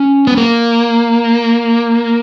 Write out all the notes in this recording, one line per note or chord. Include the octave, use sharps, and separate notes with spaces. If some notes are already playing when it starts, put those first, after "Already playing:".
Already playing: C#4
B3
A#3